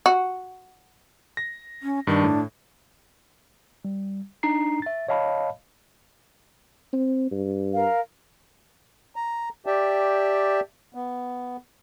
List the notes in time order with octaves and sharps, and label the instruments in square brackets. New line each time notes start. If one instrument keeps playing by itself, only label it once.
[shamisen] F#4
[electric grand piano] A#6
[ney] C#4
[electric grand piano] G2 D#3 [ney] D4
[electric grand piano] A2
[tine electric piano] G3
D4 D#4 A#5 C7
E5 A6
C#5 D#5 F5 A5 B5
[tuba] C4
G2
[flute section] A#4 F5
[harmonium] A#5
G4 D5 E5 G5 A5
B3